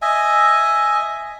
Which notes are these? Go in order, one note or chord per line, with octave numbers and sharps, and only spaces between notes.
D#5 E5 G#5